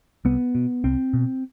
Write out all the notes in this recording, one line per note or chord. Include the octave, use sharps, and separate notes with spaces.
C2 B3
B2
C2 C4
B2